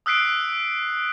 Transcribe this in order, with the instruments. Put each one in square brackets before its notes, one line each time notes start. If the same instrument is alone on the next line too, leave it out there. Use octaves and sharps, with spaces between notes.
[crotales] D#6 E6 F#6 B6 C7 D7